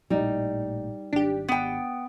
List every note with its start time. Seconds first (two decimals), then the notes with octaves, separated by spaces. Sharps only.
0.10 A1 A#2 G3 D#4
1.13 G#1 D4 G4
1.48 B3 G5